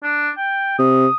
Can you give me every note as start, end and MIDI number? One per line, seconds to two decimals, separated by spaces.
0.03 0.29 62
0.37 0.77 79
0.78 1.07 48
0.78 1.16 87